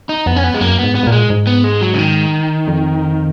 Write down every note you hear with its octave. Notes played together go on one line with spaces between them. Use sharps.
D#4
F2 B3
C#4
B3
G#3
F#2 A#3
G#2 B3
B3
G#2
A#2 A#3
G#3
G#2
B3
G#3
F#3
C#3
D#3
F2